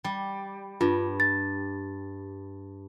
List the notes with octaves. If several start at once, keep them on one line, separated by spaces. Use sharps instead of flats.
G3
G2 F4
A6